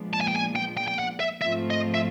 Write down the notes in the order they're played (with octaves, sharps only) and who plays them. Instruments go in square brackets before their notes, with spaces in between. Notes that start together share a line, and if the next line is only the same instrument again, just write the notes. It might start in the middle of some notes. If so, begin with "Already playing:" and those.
Already playing: [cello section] A#2 F3 G#3 B3 D4
[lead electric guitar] A5
G#5
G5
G#5
G5
G5
G5
F#5
E5
[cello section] G#2 F3 A3 C4 F4 [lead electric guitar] E5
[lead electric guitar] D#5
E5